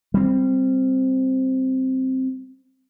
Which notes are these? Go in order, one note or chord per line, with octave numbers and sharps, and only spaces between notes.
G3 C4